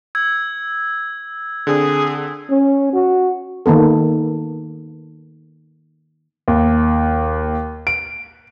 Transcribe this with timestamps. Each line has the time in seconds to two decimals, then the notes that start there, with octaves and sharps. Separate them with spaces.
0.15 E6 G#6
1.67 D3 C4 D4 G#4
2.50 C#4
2.93 F#4
3.66 D#3 A#3 B3 A4
6.48 D#2
7.87 D7